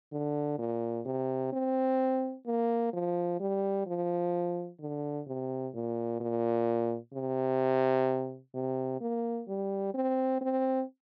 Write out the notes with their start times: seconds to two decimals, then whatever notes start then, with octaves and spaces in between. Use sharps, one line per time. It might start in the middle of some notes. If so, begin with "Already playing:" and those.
0.13 D3
0.58 A#2
1.06 C3
1.53 C4
2.46 A#3
2.93 F3
3.40 G3
3.86 F3
4.80 D3
5.27 C3
5.74 A#2
6.20 A#2
7.14 C3
8.54 C3
9.01 A#3
9.48 G3
9.94 C4
10.41 C4